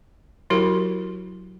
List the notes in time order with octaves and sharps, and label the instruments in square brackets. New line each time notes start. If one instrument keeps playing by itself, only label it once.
[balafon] F#3 E4 F#4 G4 A#4